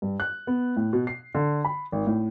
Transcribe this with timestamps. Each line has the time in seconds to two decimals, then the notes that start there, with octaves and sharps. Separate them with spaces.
0.02 G2
0.20 F#6
0.47 B3
0.76 A2
0.93 B2
1.07 C7
1.35 D3
1.65 B5
1.92 G#1
2.07 A2